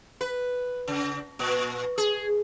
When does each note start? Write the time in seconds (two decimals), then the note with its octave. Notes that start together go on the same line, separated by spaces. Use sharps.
0.21 B4
0.88 C#3
1.39 A#2
1.98 G#4